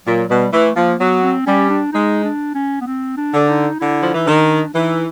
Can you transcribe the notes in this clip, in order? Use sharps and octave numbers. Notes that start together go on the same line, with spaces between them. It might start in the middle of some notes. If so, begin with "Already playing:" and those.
A#2 F#3
B2 G3
E3 A3
F3 A#3
F#3 B3
C4
G3 C#4
D4
G#3 D#4
D4
C#4
B3
C4
D4
D3
D#4
D3 E4
F3
E3 D#4
D#3 D4
E3 D#4